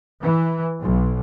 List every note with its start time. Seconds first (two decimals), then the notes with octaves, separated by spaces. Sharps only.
0.21 E3
0.81 B1